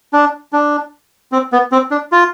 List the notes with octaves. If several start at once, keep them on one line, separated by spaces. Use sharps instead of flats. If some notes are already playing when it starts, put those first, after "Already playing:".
D4
D4
C4
B3
C4
D4
F4